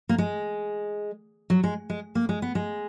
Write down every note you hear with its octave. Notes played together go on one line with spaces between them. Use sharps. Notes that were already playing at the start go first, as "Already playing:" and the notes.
A#3
G#3
F#3
G#3
G#3
A#3
G#3
B3
G#3